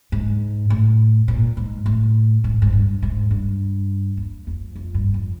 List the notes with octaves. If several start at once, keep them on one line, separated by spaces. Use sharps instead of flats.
G#2
A2
A#2
G#2
A2
G#2
G#2
G2
G#2
G2
E2
F2
F2
G2
F2